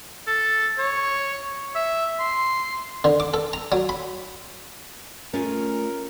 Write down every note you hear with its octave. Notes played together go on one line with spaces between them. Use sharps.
A4
C#5
E5
C6
D3
D6
A4
A#5
F#3
B5
A3 C#4 F4 G#4 A#4